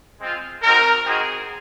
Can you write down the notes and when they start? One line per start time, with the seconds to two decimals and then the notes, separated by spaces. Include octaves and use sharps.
0.20 G#3 C4 F4
0.62 G#3 C4 D#4 F#4 A#4
1.06 C4 D#4 F#4 G#4